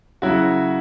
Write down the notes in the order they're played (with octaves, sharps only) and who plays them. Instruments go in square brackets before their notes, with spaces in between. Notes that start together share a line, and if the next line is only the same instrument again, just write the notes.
[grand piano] C#3 F#3 E4 F#4